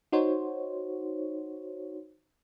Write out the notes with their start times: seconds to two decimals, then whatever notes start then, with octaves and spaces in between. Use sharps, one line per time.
0.12 D#4 F#4 C5 C#5